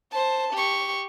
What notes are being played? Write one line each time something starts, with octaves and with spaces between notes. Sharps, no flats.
C5 A5
G4 C#6